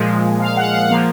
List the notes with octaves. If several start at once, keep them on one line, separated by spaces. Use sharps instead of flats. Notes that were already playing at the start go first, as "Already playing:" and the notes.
Already playing: A#2 F3 G#3
F5
F#5
F#5
F3 A#3 F5